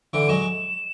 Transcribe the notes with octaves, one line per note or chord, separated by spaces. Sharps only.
D3 E3 D7
F#3 G#3 E7